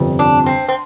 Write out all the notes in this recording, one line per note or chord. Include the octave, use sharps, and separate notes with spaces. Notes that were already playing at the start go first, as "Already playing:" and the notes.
Already playing: G1 F2 C3
D4
C4
C4